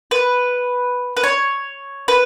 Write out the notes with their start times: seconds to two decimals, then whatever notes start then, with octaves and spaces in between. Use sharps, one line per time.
0.11 B4
1.17 B4
1.24 C#5
2.08 B4